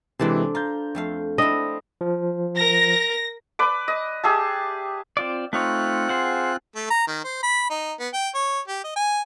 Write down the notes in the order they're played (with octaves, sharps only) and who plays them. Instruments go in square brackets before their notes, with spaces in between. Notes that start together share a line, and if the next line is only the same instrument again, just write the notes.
[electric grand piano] C3 E3 G#3 [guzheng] D4 A4 C5
[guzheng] F4 [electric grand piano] A#5 G6
[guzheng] F2 A3 F5
[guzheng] C4 E4 [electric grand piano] D4 [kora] D#5
[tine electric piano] F3
[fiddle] A#4 [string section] A#6
[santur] B4 D5 D6
D#5
G4 G#4 E5 A5
[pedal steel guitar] C4 F4 D5
[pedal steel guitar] A3 D#4 C#5 [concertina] C4 F4 F#6
[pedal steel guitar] G#4 C5 F#5
[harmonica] A3
A#5
D#3
C5
B5
D#4
B3
G5
C#5
G4
D#5
G#5